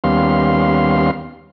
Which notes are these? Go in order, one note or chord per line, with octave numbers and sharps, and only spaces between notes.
D#2 G3 B3 C#4 F5 C6